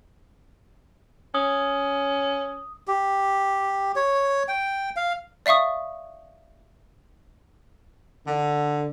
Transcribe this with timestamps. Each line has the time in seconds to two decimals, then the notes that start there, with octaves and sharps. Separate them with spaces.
1.35 C#4 D#6
2.88 G4
3.96 C#5
4.48 G5
4.96 F5
5.46 D5 E5 F5 C#6 D#6
8.25 D3